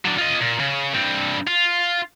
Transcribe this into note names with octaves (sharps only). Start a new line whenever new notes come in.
F#3 D4
F4 D#5
A#2
C#3
G2 C4
F4